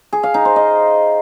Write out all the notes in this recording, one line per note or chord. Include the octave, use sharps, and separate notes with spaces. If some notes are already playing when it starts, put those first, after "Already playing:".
G#4
F5
D#4
C5
D#5